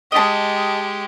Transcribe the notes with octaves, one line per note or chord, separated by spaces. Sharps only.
G#3 G4 D#5 A5